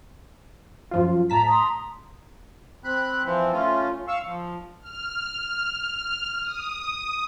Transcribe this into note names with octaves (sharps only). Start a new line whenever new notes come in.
F#2 F3 F4
A2 A5 A#5 B6
A#5 C6 D#6
C4 B5 F#6
E3 F3 C4
A3 C#4 F4
F5 C#6 E6
F3
F6
D#6